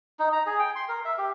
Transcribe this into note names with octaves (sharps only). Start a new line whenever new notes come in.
D#4
A#5
G#4
G5
C6
A#4
E5
G4